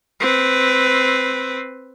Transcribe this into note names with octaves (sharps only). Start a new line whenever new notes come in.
C4 B4